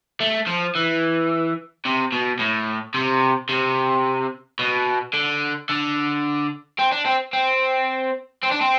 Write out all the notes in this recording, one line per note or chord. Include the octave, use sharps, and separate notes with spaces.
A3
F3
E3
C3
B2
A2
C3
C3
B2
D3
D3
C4
D4
C4
C4
C4
D4
C4